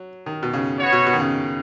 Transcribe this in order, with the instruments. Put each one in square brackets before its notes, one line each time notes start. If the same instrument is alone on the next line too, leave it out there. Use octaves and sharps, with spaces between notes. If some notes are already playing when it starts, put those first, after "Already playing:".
Already playing: [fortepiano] F#3
D#3
B2
C#3
[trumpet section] B3 F#4 C#5
[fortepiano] B2
B2
D#3
C#3